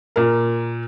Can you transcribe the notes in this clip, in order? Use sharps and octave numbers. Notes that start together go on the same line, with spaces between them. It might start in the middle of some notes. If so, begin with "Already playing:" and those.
A#2 A#4